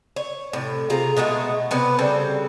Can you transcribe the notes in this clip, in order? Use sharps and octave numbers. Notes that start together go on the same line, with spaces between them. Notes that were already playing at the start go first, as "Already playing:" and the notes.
C#5
A2 C3
C3 F4 G#4 A#5
B2 G#3 A3 F#4
C3 B3 C#4 B4
C#3 G3 C4 A4